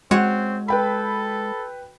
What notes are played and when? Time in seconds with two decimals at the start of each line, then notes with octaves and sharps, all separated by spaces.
0.11 G#3 C4 F#4 C#5
0.68 A4 B4 G5 B5